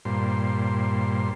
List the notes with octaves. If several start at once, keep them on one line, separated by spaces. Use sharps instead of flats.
G2 A#2 C5